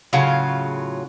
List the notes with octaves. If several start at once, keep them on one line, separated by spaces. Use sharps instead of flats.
A2 C#3 F#3 F4